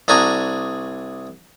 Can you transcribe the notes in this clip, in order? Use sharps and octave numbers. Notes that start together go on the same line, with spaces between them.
C2 D4 F#4 G#4 A#5